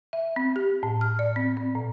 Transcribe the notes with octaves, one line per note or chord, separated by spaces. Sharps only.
E5
C4
G4
A2
F6
D5
C4
C4
A#2